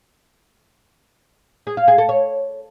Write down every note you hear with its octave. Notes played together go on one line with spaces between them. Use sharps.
G#4
F5
G#4
A4
C#5